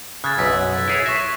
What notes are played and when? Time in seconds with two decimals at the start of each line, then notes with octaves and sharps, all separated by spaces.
0.24 C#3 F#6 G#6 A6
0.38 B1 F#2 E6 B6
0.88 E4 G#4 C#5
1.06 E5 C#6 A#6